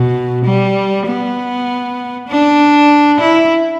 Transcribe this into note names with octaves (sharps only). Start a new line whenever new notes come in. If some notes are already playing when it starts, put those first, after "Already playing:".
Already playing: B2
G3
B3
D4
E4